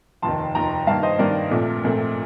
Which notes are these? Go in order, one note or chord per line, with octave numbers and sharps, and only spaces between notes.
F1 D#2 D#3 A5 C6
F1 D#2 D#3 G5 A#5
G2 D#3 A#3 F5 A5
C5 D#5
G2 D#3 A#3 A#4 D5
A#1 A#2 A3 C4
A#1 A#2 A3 C4